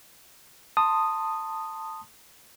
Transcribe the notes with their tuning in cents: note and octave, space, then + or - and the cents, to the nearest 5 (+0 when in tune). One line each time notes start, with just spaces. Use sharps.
A5 +15 C6 +0 D#6 -5